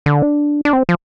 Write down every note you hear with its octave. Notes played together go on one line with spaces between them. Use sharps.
D3
D4
D4
C4
F3